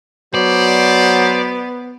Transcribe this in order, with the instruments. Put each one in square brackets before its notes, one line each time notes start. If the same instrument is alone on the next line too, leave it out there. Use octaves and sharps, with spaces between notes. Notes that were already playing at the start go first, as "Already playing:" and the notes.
[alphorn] F#3 [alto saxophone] B3 [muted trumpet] C5 [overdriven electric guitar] D5